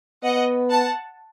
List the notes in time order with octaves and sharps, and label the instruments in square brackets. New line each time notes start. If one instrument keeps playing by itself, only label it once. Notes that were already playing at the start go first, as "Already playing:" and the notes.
[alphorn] B3 [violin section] D#5 F#5
[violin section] F#5 A5